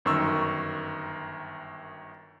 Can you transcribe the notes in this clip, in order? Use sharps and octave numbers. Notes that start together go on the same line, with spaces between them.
G1 F#2 D#3 C#6 E6